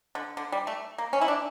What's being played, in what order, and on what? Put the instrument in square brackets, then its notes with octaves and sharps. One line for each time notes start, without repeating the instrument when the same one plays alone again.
[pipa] D3
D3
G3
A3
A#3
C#4
E4
D4